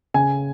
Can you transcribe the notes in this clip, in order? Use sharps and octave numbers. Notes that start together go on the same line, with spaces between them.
C#3 G#5